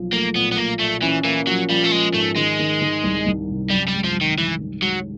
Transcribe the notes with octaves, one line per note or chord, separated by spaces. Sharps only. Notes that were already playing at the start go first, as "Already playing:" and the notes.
Already playing: B1 F3
A3 A#3
A#2 B3
B3
A#2 A#3
A#2 A3
E3 C#4
E3 A#3
F3 F#3
F3 G3
A3
F3 G#3
G#2 A3
D#3 G#3
D#3
D#3
C2
C2
C3
F#2 G3
G3
G#3
F3
G#3
D#3
D#3 E3
D#3
F#3 G#3